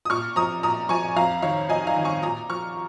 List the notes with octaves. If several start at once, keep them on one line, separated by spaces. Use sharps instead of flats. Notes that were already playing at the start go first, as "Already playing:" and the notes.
D#6
A#2 C#6 F6
F3 A#5 D#6
A#2 A#5 D#6
F3 G#5 C#6
F2 F5 A#5
D#3 C#5 F5
F2 D#5 G#5
F5 A#5
D#3
G#5 C#6
A#2 A#5 D#6
F3 C#6 F6